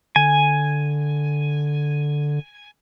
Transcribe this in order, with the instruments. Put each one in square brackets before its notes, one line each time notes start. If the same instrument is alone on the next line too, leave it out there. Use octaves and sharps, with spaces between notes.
[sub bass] D3 [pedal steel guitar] G#5